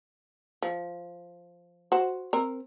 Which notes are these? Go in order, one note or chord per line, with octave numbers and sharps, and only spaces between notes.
F3
F#4 C5
C4 A#4